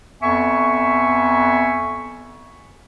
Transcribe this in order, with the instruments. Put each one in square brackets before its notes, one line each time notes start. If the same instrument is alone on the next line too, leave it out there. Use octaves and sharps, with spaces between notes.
[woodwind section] F2 B3 E5 G#5 C#6